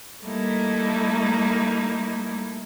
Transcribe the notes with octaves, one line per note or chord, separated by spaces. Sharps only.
G3 A3 A#3 D#4 E4